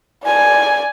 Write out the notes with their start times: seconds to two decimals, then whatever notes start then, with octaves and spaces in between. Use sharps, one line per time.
0.25 D5 G#5